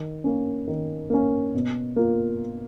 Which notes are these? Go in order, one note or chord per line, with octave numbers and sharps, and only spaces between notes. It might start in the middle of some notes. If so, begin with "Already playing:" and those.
Already playing: D#3
A#3 C#4
D#3
A#3 C#4
B2
A#3 F4